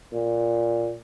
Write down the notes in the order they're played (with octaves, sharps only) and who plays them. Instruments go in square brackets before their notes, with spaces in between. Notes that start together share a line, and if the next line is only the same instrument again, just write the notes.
[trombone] A#2